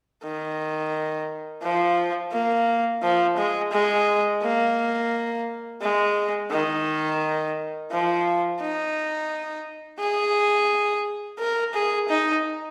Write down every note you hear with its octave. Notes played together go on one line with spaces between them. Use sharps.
D#3
F3
A#3
F3
G#3
G#3
A#3
G#3
D#3
F3
D#4
G#4
A#4
G#4
D#4